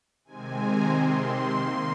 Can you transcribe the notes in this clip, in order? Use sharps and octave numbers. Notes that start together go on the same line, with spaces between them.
C3 D#3 G#3 C4 G#5
A#5
C3 D#3 C4 C6
D#3 A#3